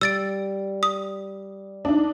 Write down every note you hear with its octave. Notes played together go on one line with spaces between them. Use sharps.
G3 E6 A6 D7
D#6
D4 D#4